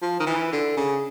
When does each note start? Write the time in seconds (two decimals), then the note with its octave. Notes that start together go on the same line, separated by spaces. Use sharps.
0.02 F3
0.20 D#3
0.26 E3
0.52 D3
0.77 C#3